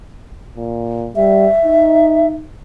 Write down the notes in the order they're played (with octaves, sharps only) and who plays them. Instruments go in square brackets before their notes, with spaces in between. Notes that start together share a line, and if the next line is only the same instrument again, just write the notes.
[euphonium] A#2
[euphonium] G3 [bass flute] E5
[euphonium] D#4